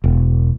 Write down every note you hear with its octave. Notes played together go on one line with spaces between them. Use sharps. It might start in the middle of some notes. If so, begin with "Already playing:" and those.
E1